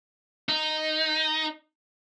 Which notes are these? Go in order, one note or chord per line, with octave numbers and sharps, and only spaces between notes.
D#4